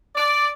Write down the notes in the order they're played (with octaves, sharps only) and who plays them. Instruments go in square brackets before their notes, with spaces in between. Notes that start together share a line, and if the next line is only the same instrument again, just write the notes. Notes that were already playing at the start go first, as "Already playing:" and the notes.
[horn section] D5